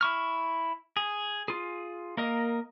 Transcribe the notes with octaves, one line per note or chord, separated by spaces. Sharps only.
E4 C#6 F6
G#4
F4 G#4
A#3 A#4 D#5